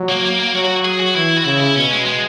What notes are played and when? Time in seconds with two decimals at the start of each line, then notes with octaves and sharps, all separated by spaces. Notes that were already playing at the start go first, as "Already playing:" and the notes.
Already playing: F#3
0.09 A#3
0.25 A#3
0.39 A#3
0.54 F#3 F#4
0.64 F#4
0.85 G#4
1.00 F#4
1.15 E3 E4
1.38 F#4
1.45 C#3 E4
1.60 E4
1.76 B2 C#4
1.91 G#3
2.06 G#3